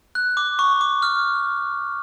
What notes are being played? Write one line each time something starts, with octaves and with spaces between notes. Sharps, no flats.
F#6
D6
C#6
D6
F6